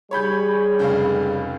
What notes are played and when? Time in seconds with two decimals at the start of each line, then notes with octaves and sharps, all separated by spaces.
0.11 G3 G#4 C#5 B5 G6
0.79 F1 C#2 F5